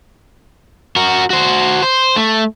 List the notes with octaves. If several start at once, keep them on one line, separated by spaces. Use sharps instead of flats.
F#4 A#4
F#4 C5
C5
A3